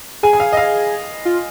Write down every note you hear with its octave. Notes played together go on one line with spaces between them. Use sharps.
G#4 G#5
G#5
F5
D#5
F5
F4